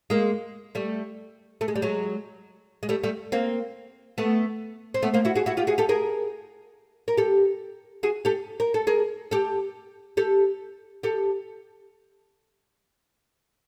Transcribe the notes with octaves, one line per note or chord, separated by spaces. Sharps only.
G#3 A#3
G3 A3
A3
G#3
G3
F#3 G#3
G#3
G3 A3
G3 A3
A#3 C4
A3 B3
C4
A3 B3
A#3 C4
E4 F#4
F#4 G#4
E4 F#4
F4 G4
F#4 G#4
G4 A4
G#4 A#4
A#4
G4 A4
F#4 G#4
G4 A4
A#4
A4
G#4 A#4
G4 A4
G4 A4
G4 A4